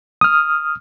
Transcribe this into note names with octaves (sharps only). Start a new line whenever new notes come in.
D#6 F6